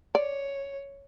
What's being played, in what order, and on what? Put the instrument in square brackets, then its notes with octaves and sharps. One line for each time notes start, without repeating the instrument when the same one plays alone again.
[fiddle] C#5 [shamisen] D5